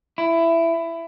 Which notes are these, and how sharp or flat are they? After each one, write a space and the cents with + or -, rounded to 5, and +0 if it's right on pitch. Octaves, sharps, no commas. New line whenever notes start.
E4 +15